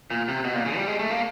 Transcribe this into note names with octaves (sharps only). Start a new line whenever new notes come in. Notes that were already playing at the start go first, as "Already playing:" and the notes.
A#2
C3
B2
A#2
C#3
G3
G#3
A3
A#3